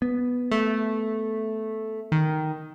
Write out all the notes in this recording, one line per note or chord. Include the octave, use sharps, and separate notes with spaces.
B3
A3
D#3